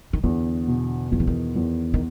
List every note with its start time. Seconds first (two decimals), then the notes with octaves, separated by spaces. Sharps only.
0.13 D#3
0.23 E2 D3
0.68 B2
1.12 E2 D#3
1.20 E3
1.27 D#3
1.56 E2
1.94 D#3